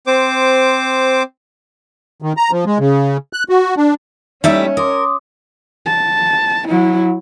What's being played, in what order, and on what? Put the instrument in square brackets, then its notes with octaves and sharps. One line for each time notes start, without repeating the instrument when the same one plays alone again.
[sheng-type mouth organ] C4 C5 D6
[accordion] D#3
A#5
F3
G#3
C#3
F#6
F#4
D4
[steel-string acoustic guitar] G3 A3 E4 [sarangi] C#4 [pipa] D#4 E5
[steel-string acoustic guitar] A#4 [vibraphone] C6 D6 D#6
[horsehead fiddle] A5
F#3 E4